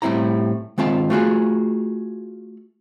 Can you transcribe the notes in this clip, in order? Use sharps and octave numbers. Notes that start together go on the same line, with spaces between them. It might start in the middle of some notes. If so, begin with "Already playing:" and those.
A2 G3 C4 E4 A#5
D#3 G#3 C4 F4 A5
A3 F4 F#4 G#4